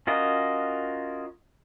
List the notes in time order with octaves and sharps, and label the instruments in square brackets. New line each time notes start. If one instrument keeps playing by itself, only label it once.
[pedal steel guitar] C#4 F4 F#4 A#4 D#5